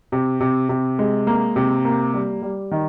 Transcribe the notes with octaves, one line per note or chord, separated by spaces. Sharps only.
C3
C3
C3
G#3
A#3
C3
A#3
G3
G3
D#3